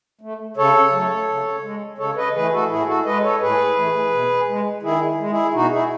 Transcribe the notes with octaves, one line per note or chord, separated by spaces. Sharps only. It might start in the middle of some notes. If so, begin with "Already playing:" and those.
A3
C#3 A4 C#5
F#3 A3
C#3
G#3
C#3 A4 C#5
B4 D#5
E3 A3 G#4 B4
F#4 A4
A2 E4 G#4
F#4 A4
G#3 B4 D#5
A4 C#5
A2 G#4 B4
E3 A3
B2
G#3
D#3 E4 G#4
G#3
E4 G#4
B2 D#4 F#4
E4 G#4